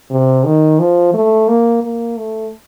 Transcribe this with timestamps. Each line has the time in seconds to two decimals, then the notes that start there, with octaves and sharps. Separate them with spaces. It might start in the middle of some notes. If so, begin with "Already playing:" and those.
0.11 C3
0.45 D#3
0.80 F3
1.14 A3
1.48 A#3
1.82 A#3
2.17 A3